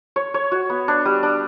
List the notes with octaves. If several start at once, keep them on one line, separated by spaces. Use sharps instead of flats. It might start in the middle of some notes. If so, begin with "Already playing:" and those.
C#5
C#5
F#4
B3
D4
G3
D4